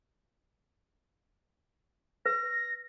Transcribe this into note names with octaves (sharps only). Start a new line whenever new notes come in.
B4 A#6